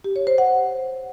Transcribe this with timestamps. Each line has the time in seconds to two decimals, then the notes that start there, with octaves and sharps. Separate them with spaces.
0.04 G4
0.16 C#5
0.27 C5
0.38 F#5